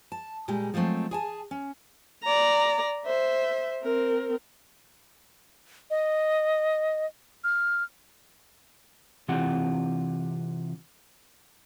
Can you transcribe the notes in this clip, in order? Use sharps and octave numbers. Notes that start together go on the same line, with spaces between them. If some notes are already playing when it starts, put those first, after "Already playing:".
A5
A#2 G3 G#3 G4
F3 F#3 G#3 A3 C4
G#4 G#5 A5
C#4
D5 A#5
C5 E5
C4 A#4
D#5
F6
C3 E3 C4 F4 G4 F#5